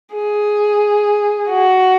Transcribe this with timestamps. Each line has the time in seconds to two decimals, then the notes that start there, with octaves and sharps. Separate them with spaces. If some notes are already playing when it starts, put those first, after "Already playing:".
0.15 G#4
1.50 F#4